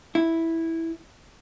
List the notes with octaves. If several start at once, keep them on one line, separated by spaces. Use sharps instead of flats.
E4